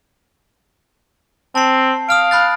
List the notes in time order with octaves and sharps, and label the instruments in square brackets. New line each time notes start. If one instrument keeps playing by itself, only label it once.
[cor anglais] C4 [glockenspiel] A5 C7
[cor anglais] F5 [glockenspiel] D#6 F6 D7
[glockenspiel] B5 F#6 A6